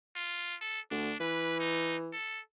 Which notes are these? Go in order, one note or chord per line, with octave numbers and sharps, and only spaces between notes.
F4
A4
D2 D4
E3 B4
D#4
A4